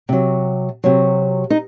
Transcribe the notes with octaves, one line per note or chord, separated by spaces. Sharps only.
C3 F#3
C3 F#3
D#4